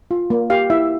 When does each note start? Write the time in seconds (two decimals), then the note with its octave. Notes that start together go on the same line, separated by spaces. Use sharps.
0.11 F4
0.30 A#3
0.50 G4 F5
0.70 E4 E5